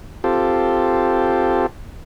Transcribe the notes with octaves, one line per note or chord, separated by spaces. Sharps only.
C4 F4 G4 A4